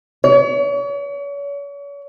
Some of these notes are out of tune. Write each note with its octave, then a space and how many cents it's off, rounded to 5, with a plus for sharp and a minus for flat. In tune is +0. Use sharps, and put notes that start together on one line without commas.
C#5 +40